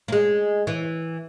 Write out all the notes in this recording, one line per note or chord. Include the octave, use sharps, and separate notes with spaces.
A#3
G#3
E3